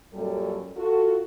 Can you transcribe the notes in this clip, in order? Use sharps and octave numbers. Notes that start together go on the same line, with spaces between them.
F#2 A#2 F#3 G3 G4 A4
F4 F#4 A4